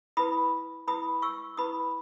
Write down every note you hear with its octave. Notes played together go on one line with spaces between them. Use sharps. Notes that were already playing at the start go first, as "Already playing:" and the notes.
E4 B4 B5 D#6
E4 B4 B5 D#6
C#6 E6
E4 B4 B5 D#6